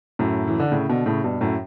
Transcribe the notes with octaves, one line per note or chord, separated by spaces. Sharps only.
F#2 A2
E3
D3
A2 C#3
B2 D3
A2 C#3
G2 B2
F#2 A2